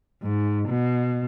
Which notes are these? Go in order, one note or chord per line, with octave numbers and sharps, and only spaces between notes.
G#2
B2